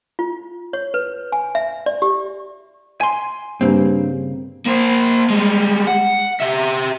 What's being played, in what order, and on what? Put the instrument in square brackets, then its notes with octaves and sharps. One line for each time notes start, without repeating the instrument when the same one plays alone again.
[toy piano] F4
C#5
B4
G#5
E5
D5
G4
[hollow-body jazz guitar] G#5 C6
[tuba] G2 [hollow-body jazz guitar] C#3 A#3 C4
[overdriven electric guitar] A#3 C5
G3 G#3
F#5
G4 E5